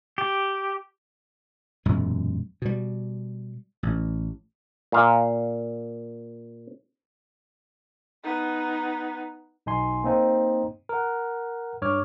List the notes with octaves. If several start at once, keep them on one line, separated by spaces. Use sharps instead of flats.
G4
E1 F#2 A#2 G#3
B2 G3
A1
A#2 F5
B3 D#4
B1 D#4 G#5 C6
A#3 C4 D#4 C5
A#4 F#5
G2 C#5 D6 F6